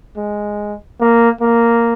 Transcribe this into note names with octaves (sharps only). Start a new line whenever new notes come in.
G#3
A#3
A#3